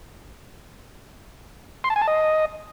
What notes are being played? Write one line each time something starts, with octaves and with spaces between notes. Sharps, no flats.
C6
A5
G#5
A5
D#5